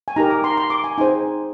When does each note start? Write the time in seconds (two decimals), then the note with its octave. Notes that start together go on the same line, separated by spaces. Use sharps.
0.08 G#5
0.16 D#4 G4 A#4 A#5
0.30 D6
0.44 C6
0.50 A#5
0.57 C6
0.70 D6
0.84 G#5
0.98 D#4 G#4 C5 G#5